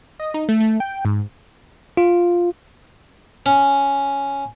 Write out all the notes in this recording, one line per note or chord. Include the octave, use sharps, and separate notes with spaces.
D#5
D#4
A3
A3
G5
G#2
F4
C#4